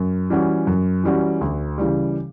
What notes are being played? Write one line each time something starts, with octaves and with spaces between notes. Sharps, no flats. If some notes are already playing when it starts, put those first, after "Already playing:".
Already playing: F#2
E3 G3 C#4 F#4
F#2
E3 G3 C#4 F#4
D2
C#3 E3 G3